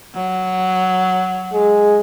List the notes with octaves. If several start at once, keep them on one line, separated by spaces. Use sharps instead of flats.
F#3
G#3